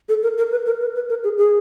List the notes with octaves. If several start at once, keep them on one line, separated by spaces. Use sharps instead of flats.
A4
A#4
A#4
B4
A#4
B4
B4
A#4
G#4
G#4